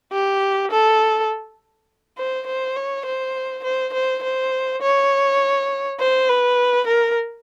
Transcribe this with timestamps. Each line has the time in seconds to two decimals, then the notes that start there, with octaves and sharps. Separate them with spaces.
0.12 G4
0.71 A4
2.18 C5
2.47 C5
2.76 C#5
3.06 C5
3.64 C5
3.93 C5
4.23 C5
4.82 C#5
6.00 C5
6.29 B4
6.87 A#4